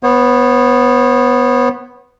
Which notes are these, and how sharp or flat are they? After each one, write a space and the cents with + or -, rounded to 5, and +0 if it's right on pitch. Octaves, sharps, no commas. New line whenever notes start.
B3 +0 C#5 -45